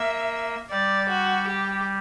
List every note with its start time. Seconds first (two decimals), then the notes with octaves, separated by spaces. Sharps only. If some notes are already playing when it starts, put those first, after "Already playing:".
Already playing: A#3 E5
0.70 G3 D5
1.09 F#4
1.48 G4